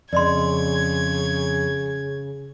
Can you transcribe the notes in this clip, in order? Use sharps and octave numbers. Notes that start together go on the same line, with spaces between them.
F2 C#3 D5 D#5 C6 G#6